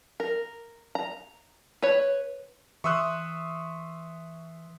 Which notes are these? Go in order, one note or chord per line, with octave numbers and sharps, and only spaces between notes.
A#4
A#5
B4 C#5
E3 E5 C6 C#6 D#6 E6 F#6